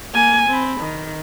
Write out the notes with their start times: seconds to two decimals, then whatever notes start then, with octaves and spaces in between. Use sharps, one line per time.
0.14 A#3 G#5
0.49 C4 B5
0.81 D#3